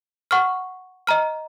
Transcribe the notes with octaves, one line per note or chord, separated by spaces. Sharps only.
F#5 C#6 F6
D#5 A#5 F6